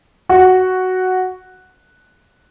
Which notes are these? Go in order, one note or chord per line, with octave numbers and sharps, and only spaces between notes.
F#4